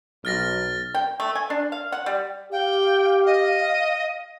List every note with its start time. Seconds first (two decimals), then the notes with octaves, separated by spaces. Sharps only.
0.25 B1 F6 A6 A#6
0.95 G5
1.20 A3
1.35 G#5
1.50 D4
1.72 F5
1.92 F#5
2.06 G3
2.52 G4 F5 G5
3.26 D#5